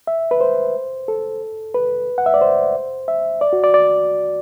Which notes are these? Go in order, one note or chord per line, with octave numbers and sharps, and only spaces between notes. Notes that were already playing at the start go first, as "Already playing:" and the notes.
E5
B4
C5
A4
B4
F#5
E5
D5
C5
E5
D5
F#4
D5
D5